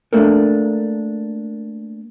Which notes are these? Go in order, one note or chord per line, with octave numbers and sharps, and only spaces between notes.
A3 A#3 D4 A4 A#4